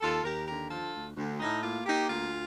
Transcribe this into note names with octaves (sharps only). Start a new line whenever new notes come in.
D#2 F4 A4
D#2 G4 A#4
D3 G4 A#4
F3 F4 A4
D2
D2
A2 D#4
A#3 F4
A#3 D#4 G4
D2 F4